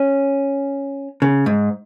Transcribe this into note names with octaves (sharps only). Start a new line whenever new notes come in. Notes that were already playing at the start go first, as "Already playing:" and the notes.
Already playing: C#4
C#3
G#2